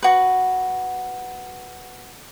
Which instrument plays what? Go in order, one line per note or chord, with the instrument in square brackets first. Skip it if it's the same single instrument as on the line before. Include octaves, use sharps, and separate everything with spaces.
[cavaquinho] F#4 B4